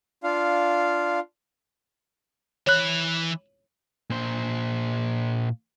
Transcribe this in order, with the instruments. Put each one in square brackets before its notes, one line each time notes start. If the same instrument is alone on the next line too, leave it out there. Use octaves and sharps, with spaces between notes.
[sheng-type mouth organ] D4 F4 F5
[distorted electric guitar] E3 B5 [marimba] C#5 F#6
[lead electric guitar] A#2 C5